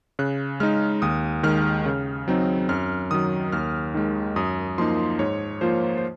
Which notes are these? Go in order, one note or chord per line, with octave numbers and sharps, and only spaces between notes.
C#3 F#6
G#3 D#4 F6
D#2 D#6
D#3 G#3 F6
C#3
F#3 C4 D#4
F#2 F6
D#3 F#3 D#6
D#2 F6
D#3 G#3
F#2 D#6
F3 A#3 D#4 C6
G#2 C#5
F3 A#3 F4 C5
C5